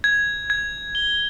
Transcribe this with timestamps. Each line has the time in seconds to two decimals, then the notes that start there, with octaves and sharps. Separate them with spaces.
0.04 G#6
0.50 G#6
0.95 G7